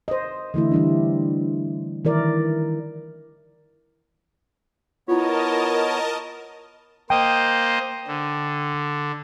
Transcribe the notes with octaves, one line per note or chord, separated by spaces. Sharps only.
C5 D#5
D3 E3 A3 E4
E3 G3 D4
D#3 E3 E4 A#4 D5
B3 E4 F4 A#4 C#5 D#5 A5
A#3 C5 D#5 G5
D3